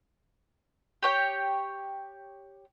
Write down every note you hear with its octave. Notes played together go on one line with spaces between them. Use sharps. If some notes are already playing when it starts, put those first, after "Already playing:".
G4 C#5 G5